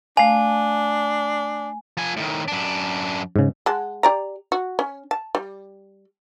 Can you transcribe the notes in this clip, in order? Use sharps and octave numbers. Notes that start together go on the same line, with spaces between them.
A3 D4 F5 G#5
F3 G#5
A2 D#3
F#2 D4
G#2 C#3
G#3 F#5 A5
G4 D5 A#5
F#4
C#4
A5
G3